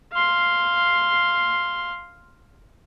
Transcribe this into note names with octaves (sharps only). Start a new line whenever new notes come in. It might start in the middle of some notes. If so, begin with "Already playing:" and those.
F5 C6